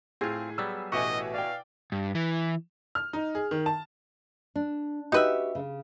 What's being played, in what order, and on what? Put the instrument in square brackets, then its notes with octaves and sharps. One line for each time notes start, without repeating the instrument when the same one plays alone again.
[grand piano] A2 [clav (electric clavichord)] C4 F4 [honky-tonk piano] G#4
[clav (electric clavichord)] F#3 G3 B3 [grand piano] E6
[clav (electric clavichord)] A1 G4 F#5 [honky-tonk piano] B2 E4 G#5 [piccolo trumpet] D#5 [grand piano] C#6
[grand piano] D5 G5 [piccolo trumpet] F5
[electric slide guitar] G2
E3
[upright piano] F6
D#4
G#4
D#3
A5
[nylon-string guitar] D4
[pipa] D#4 B4 E5 [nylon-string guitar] F#4 G4
[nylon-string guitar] C#3